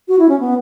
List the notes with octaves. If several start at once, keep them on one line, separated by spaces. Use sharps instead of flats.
F#4
E4
C#4
B3